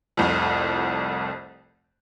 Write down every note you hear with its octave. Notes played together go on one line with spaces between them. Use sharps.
F1 C2 F2